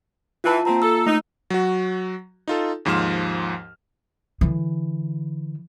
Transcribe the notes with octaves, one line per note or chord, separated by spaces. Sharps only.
E3 F4 B4 A5
A#3 C4 F4 A#5
A4 E6
A3 D#4
F#3 F#4
D#4 F4 A4
D#2 G#2 F3 C6 F6 E7
D3 E3